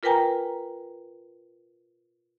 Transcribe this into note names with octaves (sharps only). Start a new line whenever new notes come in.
F4 A#4 B4 G5 G#5 A#5